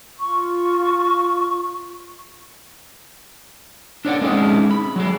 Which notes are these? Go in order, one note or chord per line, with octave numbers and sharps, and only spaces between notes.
F4 C#6
D4 C#5 D5 F#5
G#3 C4 C#4 D#4 E4 G#4
B5
F#3 G#4